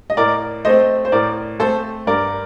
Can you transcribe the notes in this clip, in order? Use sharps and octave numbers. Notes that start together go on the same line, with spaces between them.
D#5
A2 A#4 D5
A3 C4 C5 D#5
C5
A2 A#4 D5
A3 C4 A4 C5
G2 A#4 D5